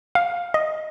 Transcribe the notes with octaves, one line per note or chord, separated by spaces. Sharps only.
F5
D#5